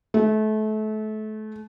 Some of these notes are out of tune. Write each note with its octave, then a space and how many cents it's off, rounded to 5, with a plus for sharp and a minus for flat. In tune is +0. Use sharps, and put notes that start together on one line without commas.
A3 -30